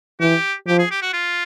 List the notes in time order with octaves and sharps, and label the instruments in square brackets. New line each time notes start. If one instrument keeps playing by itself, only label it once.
[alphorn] E3 [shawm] G4
[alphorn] F3 [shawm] G4
[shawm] G#4
G4
F#4
F4